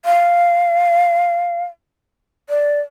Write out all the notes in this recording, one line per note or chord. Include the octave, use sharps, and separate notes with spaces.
F5
D5